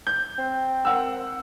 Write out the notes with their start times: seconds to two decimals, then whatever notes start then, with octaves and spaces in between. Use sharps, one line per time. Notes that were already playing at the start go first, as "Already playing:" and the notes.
0.07 G6
0.38 C4
0.85 A#4 F#5 E6